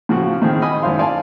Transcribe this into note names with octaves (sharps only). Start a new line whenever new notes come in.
A2 C#3 F3 F#4
A2 D#3 C4 G#4
D#5 G#5 B5 D#6
G#1 F#2 E4 C5 F5 C6
D5 F5 G#5 A5 C6